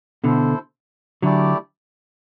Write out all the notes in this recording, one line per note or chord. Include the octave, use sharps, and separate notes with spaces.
B2 D3 E4 A4 C5
D3 F#3 A3 E4 G4 D5